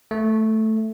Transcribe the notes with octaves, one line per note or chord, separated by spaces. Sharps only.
A3